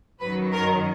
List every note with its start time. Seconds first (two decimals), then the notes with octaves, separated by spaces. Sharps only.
0.21 F#2 D#3 F#3 B4
0.53 A#4